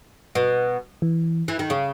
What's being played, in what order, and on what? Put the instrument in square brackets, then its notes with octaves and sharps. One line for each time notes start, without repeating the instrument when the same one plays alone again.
[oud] B2
[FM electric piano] E3
[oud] E3
D#3
C#3